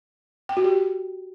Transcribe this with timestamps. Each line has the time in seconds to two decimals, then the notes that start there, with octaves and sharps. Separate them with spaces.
0.49 G5
0.57 F#4
0.64 G4